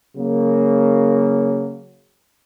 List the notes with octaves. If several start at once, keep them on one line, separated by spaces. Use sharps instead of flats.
C#3 F#3 A#3